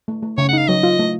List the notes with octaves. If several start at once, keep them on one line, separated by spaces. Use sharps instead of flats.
A3
A3
C#3 C#5
F#5
D#4 F5
F#3 D#5
F4
A3